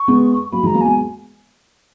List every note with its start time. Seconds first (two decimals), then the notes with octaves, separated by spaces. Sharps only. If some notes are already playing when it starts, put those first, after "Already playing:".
Already playing: C#6
0.08 G#3 B3
0.52 F#3 A#3 B5
0.63 E3 G#3 A#5
0.74 F#3 A#3
0.81 G#3 B3 G#5